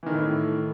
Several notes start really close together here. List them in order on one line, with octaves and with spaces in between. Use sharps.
E3 D#3 A3 A2